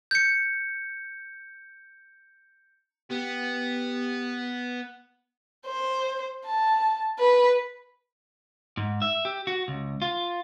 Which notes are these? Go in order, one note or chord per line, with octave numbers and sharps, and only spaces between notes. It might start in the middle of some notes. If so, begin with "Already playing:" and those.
G6 C#7
B3 G4
C5
A5
B4
G#2
E5
G4
F#4
C#2
F4